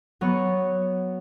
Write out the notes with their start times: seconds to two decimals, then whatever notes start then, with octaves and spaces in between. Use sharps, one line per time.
0.21 F#3 B3 C#5